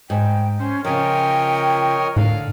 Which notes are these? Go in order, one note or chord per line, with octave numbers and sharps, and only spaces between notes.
G#2 G5
C#4 C5
C#3 F3 A#4 C#5 D#5 G5
A2 D3 F5